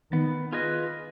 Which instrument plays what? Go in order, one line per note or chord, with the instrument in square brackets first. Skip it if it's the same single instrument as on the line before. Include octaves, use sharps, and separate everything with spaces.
[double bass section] D#3 [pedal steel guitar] B3
[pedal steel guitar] F4 G#4 B4 D#5